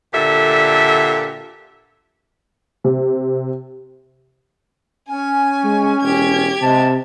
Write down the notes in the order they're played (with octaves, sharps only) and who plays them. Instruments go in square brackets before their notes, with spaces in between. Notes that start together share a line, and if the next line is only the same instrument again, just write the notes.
[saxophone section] A#2 D3 G4 A4 E5
[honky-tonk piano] C3
[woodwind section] C#4 [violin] G#5
[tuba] G#3
[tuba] E1 [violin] G4 G#6
[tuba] C3 [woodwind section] G#3 A5